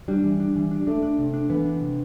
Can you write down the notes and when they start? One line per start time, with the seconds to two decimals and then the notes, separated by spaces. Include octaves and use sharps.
0.08 G3 D4
0.24 E3
0.40 D4
0.56 E3
0.71 D4
0.87 A3 D4
1.03 D4
1.19 C3
1.34 D4
1.50 E3 B3
1.66 D4
1.81 C3